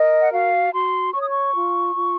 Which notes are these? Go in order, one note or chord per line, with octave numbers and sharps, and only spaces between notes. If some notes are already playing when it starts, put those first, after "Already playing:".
Already playing: A#4 D#5
F#5
F#4 F5
F#4 C6
C#5 C#6
D#6
C#6
F4
F4